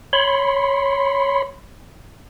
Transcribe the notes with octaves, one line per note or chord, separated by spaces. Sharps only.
C#5 B5 C6